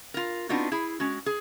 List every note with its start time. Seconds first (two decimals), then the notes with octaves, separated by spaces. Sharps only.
0.14 F4 A#4
0.49 B3 C4 D4 D#4 F4 F#4
0.72 E4 G#4
1.00 G#3 C#4 F#4
1.26 G#4